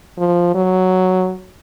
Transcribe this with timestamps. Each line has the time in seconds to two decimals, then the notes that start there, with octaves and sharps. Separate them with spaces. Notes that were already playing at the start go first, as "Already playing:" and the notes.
0.18 F3
0.55 F#3